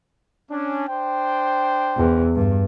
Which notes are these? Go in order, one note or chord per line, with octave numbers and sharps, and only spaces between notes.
C#4 D4
D4 C5 G5
E2
G2